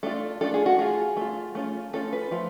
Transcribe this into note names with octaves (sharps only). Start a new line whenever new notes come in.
A3 D4 F4 A4
A3 D4 F4 A4
G#4
F#4
A3 F4 G#4
A3 F4
A3 C#4 F4
A3 C#4 F4 A4
B4
F3 A3 F4